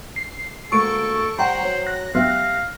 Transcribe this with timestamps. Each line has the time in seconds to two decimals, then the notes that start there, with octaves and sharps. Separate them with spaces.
0.16 C7
0.72 D2 G#3 A#3 A4 C#6 D7
1.39 G3 C5 F#5 G5 A#5
1.63 F#3
1.86 F#6 A#6
2.15 G#1 F#3 B3 G4 E5 F5